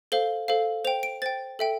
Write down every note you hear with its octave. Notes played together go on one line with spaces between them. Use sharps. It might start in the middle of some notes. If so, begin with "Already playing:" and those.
A4 C5 F5 G7
A4 C5 F5
C5 G5 F7
D7
C5 G5 A6
A4 E5 G5